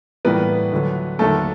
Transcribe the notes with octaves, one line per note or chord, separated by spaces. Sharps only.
A2 E3 G3 A#3 B3 B4
D2 D3 F#3
D#2 D3 F#3 A3 A#3 A4